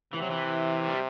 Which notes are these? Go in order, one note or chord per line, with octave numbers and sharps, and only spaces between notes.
C3 E3
F#3
E3
G3